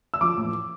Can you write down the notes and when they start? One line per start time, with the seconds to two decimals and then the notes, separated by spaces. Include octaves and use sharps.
0.14 E6
0.21 F3 D6
0.37 A1